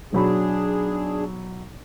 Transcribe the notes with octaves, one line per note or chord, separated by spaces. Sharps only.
B1 F#3 D4 G#4 B5